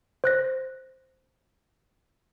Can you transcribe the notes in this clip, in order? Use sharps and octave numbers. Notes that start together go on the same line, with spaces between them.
C5 F#6 A#6